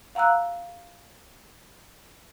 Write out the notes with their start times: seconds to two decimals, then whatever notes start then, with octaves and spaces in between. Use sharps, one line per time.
0.15 F5 F#5 A#5 E6 F#6